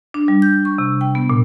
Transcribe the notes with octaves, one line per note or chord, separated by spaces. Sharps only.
D4
G3
G6
C#6
C3
G5
B3
A#2